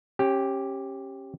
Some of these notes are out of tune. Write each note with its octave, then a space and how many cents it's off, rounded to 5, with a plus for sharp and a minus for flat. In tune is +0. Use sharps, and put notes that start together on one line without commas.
C#4 -30 G4 +0